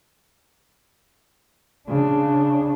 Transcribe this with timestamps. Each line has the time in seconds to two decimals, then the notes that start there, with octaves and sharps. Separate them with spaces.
1.88 C#3 D4